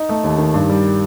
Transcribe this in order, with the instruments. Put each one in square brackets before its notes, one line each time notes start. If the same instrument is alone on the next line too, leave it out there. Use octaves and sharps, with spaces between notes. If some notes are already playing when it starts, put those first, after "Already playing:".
Already playing: [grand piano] D#4
A3
D#2
D#3
G2
G3